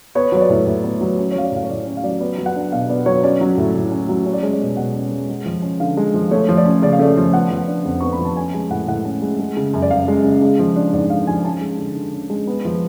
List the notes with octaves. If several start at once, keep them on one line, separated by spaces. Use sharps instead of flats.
B3 C#5
F#3 C#5
D5
A2
A2
B3
F#3
C#4
C#5
F#3 F5
D5
A2 F5
C#5
A2 D5
C#4 C#5
F5
F#3 D5
B3 D5
F#3
F#5
D4
B2 F5
B3 D5
F#3 C#5
C#4 D5
F#3
A2
A2
C#4
F#3
C#4 C#5
D5
G#3 C#5
D5
B2
B2 F#5
C#4
G#3
G#3
F3
C#4
D3 F5
G#3
F3
A3 C#5
F3
D5
C#4
C#3 D5
F5
A3 D5
F3
B3 F#5
F3
D4
F2
B3 C#6
B5
F3
A5
C#4 G#5
G#3 G#5
A2 F#5
A2 F#5
C#4
G#3
G#3
C#3
F#2
D5
F#2 F5
G#3
C#3
G#3
F3
D4
G#2 D5
G#3 F5
F3 G#5
G#5
C#4 A5
G#3
D3
D3
C#4
G#3
B3
F3